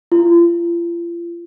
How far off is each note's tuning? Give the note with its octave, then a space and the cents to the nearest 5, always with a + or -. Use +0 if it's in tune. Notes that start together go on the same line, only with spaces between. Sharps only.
F4 -40